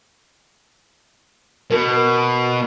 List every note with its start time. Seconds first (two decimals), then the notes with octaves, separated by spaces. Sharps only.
1.70 B2 A#4